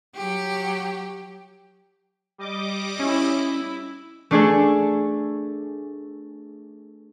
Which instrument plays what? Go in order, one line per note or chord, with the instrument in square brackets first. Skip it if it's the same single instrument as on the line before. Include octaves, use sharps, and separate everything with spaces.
[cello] F#3 G4
[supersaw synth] G3 D#5 D6
[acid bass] C#4 [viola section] E4
[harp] A3 D4 G#4 A4